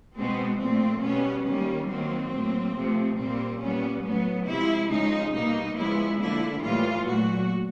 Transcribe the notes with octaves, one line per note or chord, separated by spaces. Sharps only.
B2 G#3 B3 C4
A#2 F3 A3 C4
B2 G3 B3 C#4
D#3 G3 A#3 C#4
D#3 F#3 A#3 C4
A2 F#3 A#3
C3 F3 A3
A#2 G3 A#3 C4
A#2 G3 B3 C#4
A2 F#3 B3
C3 F3 G#3 E4
C#3 F3 G#3 D#4
B2 G3 A#3 D#4
C#3 F3 G#3 B3 E4
D3 F3 A#3 E4
A2 E3 G3 A#3 F4
A#2 F#3 A3 F#4